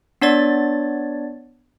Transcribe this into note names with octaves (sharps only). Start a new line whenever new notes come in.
B3 D4 C#5 D5 A6